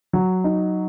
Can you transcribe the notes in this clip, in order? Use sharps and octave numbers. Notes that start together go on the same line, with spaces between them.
F#3
D#4